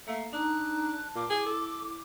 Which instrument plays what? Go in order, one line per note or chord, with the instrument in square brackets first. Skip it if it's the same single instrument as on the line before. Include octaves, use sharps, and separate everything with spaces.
[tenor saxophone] A3 [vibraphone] A#3 [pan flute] F5
[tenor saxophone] D4 [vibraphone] D#4 A#5 [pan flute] F#6
[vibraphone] A5
[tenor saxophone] A#2 [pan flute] D6
[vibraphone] E4 [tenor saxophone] G#4
[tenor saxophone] A4